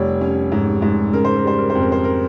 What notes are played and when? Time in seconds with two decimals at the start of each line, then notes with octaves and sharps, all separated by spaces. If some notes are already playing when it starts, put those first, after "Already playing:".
Already playing: F1 G3 C#5
0.21 C#4
0.52 G#2
0.82 G#2
1.13 C#3 A#4
1.25 C5
1.36 A#4
1.44 G3 C5
1.59 A#4
1.70 C5
1.75 F2
1.81 A#4
1.92 C5
2.04 A#4